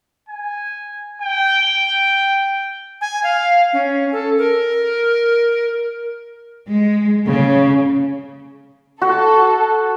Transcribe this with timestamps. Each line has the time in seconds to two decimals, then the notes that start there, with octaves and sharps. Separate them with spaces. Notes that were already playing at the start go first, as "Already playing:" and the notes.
0.29 G#5
1.22 G5
3.01 G#5
3.24 F5
3.73 C#4
4.12 A4
4.38 A#4
6.68 G#3
7.26 C#3
9.02 F#4 A4